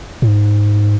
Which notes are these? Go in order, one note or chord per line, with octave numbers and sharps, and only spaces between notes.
A2
G#2